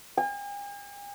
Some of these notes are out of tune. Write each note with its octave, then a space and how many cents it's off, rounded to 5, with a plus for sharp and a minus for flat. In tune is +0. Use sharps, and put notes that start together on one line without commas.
G#5 -45